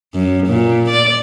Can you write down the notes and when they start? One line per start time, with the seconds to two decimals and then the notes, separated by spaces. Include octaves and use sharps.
0.15 F#2
0.47 A#2
0.90 D5